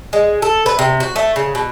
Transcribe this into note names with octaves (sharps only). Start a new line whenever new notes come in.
G#3
A4
B4
C3
F#4
A3
C#3
B2